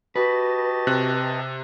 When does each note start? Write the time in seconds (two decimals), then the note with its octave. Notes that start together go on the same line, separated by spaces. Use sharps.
0.16 F#4 G4 B4 D#5 A5
0.87 C3 F#6